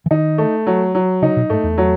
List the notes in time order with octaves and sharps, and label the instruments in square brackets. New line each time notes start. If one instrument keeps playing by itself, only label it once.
[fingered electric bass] E3
[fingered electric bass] D#3 [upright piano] D#4
[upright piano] A3
F#3
F#3
[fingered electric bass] C#3 [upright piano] D#4
[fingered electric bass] B2
[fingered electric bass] G#2 [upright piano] A3
[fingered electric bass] E2
[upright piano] F#3